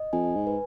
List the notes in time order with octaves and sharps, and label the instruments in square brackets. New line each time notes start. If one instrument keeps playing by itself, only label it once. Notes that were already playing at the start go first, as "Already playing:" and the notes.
Already playing: [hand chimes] D#5
[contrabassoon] F2 [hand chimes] G#5
[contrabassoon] G#2
[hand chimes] B4